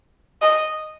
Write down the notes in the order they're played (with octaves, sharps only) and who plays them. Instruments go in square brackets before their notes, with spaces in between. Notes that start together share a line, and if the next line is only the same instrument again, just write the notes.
[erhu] D#5